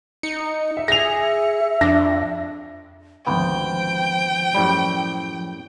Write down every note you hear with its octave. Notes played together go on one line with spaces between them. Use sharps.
D#4 C#7
E5
G#4 E5 A#6 F7
F2 D4 A#6
G#1 D2 F3 B3 G5
F#2 A2 G3